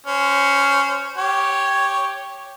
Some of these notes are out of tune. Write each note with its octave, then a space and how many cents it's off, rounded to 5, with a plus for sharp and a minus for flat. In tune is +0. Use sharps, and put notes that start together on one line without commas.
C#4 +5 C5 -20
G4 +0 C#5 +0